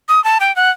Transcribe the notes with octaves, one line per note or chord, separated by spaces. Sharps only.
D#6
A5
G5
F#5